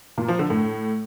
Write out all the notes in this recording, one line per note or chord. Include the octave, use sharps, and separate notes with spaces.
A#2
F3
D3
A2